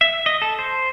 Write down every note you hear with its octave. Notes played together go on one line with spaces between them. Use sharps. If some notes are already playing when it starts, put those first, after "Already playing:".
E5
D#5
A4
C5